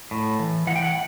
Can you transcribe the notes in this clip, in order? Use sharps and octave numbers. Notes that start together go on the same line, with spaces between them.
A2
E3
E3 F#5
G5
F#5